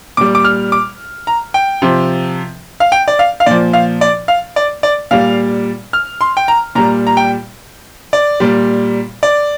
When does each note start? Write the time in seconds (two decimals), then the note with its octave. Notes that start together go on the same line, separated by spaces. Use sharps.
0.17 A#2 G3 D6
0.35 D6
0.44 F6
0.72 D6
1.27 A#5
1.54 G5
1.82 C3 F3
2.80 F5
2.92 G5
3.08 D5
3.19 F5
3.40 F5
3.46 A#2 F3 D5
3.73 F5
4.01 D5
4.28 F5
4.56 D5
4.83 D5
5.11 A#2 G3 F5
5.93 F6
6.21 C6
6.37 G5
6.48 A#5
6.75 A#2 G3 A#5
7.07 A#5
7.17 G5
8.13 D5
8.40 A#2 G3
9.23 D5